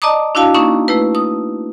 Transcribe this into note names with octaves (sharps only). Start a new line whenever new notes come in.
D5 D#5 A5 A#5 D6 D#6
D4 E4 F#4 F5 A5
A#3 C#4 D#4 C#6
A3 E4 B4
D#6